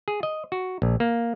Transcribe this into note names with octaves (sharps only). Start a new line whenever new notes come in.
G#4
D#5
F#4
A#1
A#3